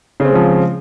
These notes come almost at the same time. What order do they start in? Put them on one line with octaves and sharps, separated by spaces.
C#3 C4 G#3 F3